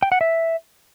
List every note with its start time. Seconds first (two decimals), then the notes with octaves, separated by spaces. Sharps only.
0.03 G5
0.12 F#5
0.21 E5